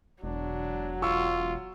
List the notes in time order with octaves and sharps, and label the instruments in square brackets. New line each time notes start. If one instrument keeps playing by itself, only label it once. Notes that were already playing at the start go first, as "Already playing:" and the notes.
[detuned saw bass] E1 [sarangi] F#3 [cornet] D4
[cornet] F4 [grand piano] C#6 E6